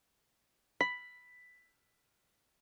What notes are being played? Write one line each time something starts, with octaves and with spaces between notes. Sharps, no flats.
B5 B6